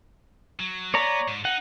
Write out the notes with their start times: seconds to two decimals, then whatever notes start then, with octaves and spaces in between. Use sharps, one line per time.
0.60 F#3
0.94 B3 C#5 D5 A#5
1.28 G#2
1.45 D#4 F#5